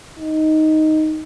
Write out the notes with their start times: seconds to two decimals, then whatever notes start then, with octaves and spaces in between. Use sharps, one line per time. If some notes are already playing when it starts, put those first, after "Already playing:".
0.19 D#4